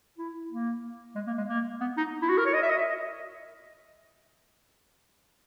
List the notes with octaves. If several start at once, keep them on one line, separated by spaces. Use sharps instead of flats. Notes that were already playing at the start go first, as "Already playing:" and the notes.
E4
A#3
G#3
A#3
G#3
A#3
B3
D#4
E4
F#4
A#4
C#5
D#5
E5
D#5
E5
D#5